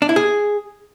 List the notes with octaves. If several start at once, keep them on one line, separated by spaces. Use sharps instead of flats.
D4
E4
G#4